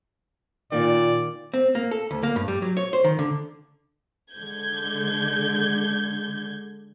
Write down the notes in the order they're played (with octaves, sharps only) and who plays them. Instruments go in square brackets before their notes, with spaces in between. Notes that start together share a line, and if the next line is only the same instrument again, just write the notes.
[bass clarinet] A#2 [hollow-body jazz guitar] D#3 A#3 [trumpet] D5
[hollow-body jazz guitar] C4
A#3
A4
D2
A#3
G2
G3
F#3
C#5
C5
D#3
D3
[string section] D3 G#3 G6 G#6